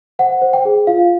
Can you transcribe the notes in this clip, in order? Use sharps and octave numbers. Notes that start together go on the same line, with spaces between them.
C5 F#5
C5
G5
G#4
F4 F5